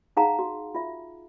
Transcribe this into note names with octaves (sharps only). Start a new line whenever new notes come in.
D#4 G#4 F5 F#5 A#5
F#4
F4 E5